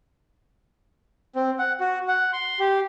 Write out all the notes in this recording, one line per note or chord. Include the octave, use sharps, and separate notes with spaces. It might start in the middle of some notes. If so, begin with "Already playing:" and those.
C4
F#5
F#4
F#5
C6
G4